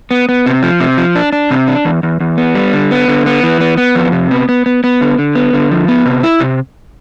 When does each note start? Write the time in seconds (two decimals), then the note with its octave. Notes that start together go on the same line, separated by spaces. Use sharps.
0.11 B3
0.29 B3
0.46 C3
0.63 F3
0.80 C3
0.97 F3
1.15 D4
1.33 D4
1.51 C3
1.68 D4
1.85 E2
2.03 E2
2.20 E2
2.37 B3
2.55 G3
2.73 D3
2.91 B3
3.08 D3
3.26 B3
3.43 E3
3.61 B3
3.77 B3
3.95 F2
4.12 C3
4.31 B3
4.49 B3
4.66 B3
4.84 B3
5.01 D3
5.18 D3
5.35 B3
5.53 D3
5.71 F3
5.88 B3
6.06 C3
6.23 E4
6.40 C3